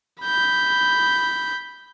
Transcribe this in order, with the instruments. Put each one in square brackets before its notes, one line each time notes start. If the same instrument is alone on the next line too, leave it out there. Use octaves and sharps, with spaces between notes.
[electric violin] B5 G6